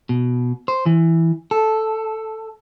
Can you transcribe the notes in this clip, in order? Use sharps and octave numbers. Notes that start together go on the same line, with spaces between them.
B2
C5
E3
A4